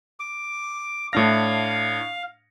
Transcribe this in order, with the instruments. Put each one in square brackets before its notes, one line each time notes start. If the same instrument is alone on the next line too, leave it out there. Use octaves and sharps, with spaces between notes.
[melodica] D6
[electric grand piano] A2 D4 A#6 [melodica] F5